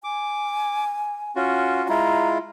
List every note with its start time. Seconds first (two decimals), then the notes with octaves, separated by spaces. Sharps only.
0.04 G#5 D6
1.36 C#4 F4 F#4
1.89 G#3 E4 F4 A#5